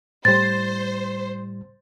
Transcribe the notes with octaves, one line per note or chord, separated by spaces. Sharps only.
A2 G3 C5 A6